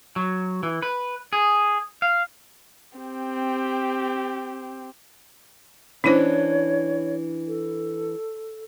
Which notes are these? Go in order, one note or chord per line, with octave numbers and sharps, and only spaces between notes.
F#3
E3
B4
G#4
F5
C4 G4
E3 C#4 D4 E4 C5 C#5
A4